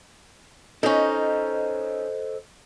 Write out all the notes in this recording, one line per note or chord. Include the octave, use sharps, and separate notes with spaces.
C#4 D#4 A4 C5 D#5